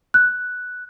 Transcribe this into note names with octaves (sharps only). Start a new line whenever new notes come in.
F#6